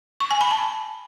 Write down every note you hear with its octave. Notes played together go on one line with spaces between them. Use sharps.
C#6
G#5
B5
A5